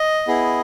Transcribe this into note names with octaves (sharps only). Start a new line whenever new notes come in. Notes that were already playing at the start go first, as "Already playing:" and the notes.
Already playing: D#5
B3 E4 G#4